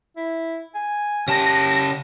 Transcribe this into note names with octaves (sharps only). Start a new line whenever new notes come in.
E4
G#5
C#3 G4 A5 A#6